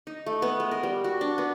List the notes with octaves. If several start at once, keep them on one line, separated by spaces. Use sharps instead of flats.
D#4
A3
B3
G#3
A#4
G3
F#4
D4
B3